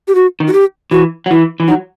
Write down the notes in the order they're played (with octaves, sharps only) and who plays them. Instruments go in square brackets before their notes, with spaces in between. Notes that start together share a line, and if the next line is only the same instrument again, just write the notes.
[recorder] G4
F#4
[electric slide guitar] D#3
[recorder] F#4
G4
[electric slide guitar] E3 [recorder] F#4
[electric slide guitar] F#3
[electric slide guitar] E3 [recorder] E4
[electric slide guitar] E3
[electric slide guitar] F#3 [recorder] D#4